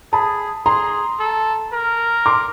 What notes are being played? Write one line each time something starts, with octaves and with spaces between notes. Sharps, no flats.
G#4 A5 B5
G#4 A#5 C6
A4
A#4
C6 D6